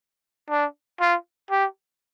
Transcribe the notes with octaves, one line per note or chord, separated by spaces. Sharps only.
D4
F4
G4